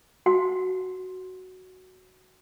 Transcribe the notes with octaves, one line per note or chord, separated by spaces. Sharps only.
F#4 F#5